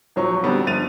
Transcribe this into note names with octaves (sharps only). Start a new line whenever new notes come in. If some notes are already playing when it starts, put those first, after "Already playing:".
D#1 F3 F#3 C#5 C#6
D3 F#3 G3 B3 C4 D4
G1 F3 A6 D#7 F7